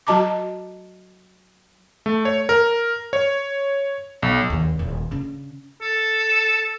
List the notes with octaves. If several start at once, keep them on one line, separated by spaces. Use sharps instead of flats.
F#3 F#4 D#5 A5 A#5 D6
A3
C#5
A#4
C#5
B1
D#2 D3
D#1
C#3 D4
A4